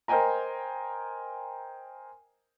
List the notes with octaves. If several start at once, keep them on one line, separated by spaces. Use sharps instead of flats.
A#4 C5 D#5 G5 G#5 A#5